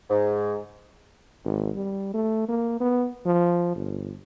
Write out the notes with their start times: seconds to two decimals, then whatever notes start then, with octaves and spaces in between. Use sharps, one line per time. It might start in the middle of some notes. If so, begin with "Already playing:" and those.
0.09 G#2
1.45 G#1
1.76 G3
2.14 A3
2.48 A#3
2.80 B3
3.26 F3
3.75 G1